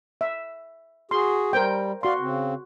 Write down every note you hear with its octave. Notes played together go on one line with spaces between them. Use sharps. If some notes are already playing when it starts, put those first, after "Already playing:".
E5
F#4 G#4 C6
G3 A#4 C5 G5
F#4 D5 F5 C6
C#3 C4